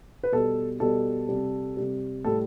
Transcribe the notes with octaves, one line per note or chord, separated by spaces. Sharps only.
B4
B2 G3 A4
B2 G3 A4
C3 G3
C3 G3
A2 G3 A4